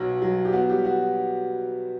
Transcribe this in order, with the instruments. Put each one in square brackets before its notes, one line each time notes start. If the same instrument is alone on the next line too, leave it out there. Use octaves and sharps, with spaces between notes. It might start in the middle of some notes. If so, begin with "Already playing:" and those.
Already playing: [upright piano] B1 F#3 B3
F#3
G4
B3 F#4
G3 G4
B3 F#4